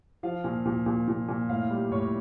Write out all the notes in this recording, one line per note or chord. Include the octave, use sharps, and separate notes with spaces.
F3 F5
A#2
A#2
A#2
A#2
A#2
A2 F5
G3
A2 C#5